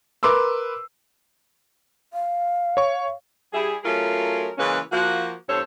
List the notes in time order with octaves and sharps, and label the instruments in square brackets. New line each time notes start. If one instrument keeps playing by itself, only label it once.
[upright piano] A#4 B4 C6 D6 E6
[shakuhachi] F5
[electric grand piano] C#5 C#6
[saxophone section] G3 E4 G#4
F#3 A3 C#4 F4 G#4 A#4
C#3 E3 G#3 A#3 C#4 B4
F3 A#3 F#4
E2 G2 C4 A4 C5 C#5